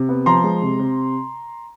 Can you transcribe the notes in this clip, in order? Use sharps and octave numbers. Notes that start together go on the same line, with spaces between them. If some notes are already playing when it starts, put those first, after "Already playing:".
Already playing: C3
B3
F3 A#5 C6
G#3
C3
C3